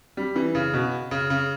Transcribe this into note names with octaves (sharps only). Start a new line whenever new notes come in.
G3
E3
C#3
B2
C#3
C#3